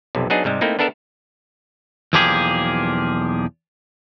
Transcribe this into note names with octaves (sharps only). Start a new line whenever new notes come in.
B1 F2 C3
F#3 B3 D4 D#4 G#4
G#2 C3 G3 G#3
A3 A#3 C4 D#4 E4
B3 D4 A4 A#4 E5
B1 E2 F3 A#3 G4 G#4